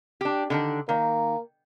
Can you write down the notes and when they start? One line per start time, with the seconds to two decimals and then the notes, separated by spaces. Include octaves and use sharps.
0.21 D4 G4
0.50 D3 D#3 D4
0.89 D#3 A#3